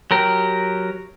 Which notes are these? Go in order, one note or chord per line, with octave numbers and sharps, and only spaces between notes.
F#3 G4 A#4